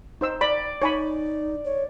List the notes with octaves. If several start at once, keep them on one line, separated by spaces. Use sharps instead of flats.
D#4 C5 E6
D5 B5
D#4 C#5 G#5 B5
C#5